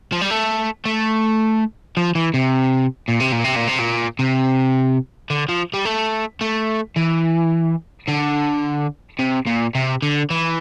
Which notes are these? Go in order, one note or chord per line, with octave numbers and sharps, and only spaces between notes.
F3
G3
A3
A3
F3
E3
C3
A#2
C3
A#2
C3
A#2
C3
A#2
C3
D3
F3
G3
A3
A3
E3
D3
C3
A#2
C3
D3
E3